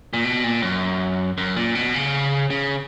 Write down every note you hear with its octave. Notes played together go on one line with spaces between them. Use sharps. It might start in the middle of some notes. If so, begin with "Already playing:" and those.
A#2
B2
A#2
F#2
F#2
A#2
B2
C#3
C#3